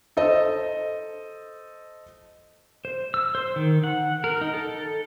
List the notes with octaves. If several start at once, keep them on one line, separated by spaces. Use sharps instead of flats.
A4 C5 D#5
C5
E6
C5
D#3
F#5
A#4
D#4
A4